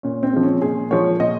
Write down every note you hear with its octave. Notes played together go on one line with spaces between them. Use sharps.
A#2 C#4
C4
F3 G#3
C#4
A#2 G#4
F3 G#3 C#5
A#2 D#5